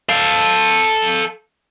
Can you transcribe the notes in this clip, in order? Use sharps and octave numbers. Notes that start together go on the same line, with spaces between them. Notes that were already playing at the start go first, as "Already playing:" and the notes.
A4 F5